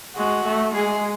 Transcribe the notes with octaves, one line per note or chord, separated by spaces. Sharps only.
G#3 F#4
A3
G#3 G#4